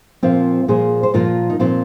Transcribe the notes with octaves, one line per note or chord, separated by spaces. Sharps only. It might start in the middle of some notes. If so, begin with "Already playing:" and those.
A#2 F3 C4 F4
A#2 F3 G#4 C5
C5
A#2 F3 F4 A#4
D#4
A#2 F3 C4 F4